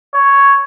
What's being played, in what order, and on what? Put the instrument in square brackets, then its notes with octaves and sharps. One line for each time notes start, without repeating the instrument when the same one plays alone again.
[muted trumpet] C#5